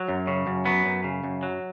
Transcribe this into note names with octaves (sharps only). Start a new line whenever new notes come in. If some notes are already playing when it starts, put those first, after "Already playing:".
Already playing: F#3
F#2
C#3
F#2
F#3 B3
F#2
C#3
F#2
F#3